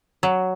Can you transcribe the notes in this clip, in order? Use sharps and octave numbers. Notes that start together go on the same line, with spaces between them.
F#3